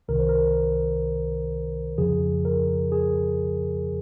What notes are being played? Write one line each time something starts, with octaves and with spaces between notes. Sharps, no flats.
C2 C3 D#3 A#4
C5
A#4
F2 C#3 F3 G#4
A#4
G#4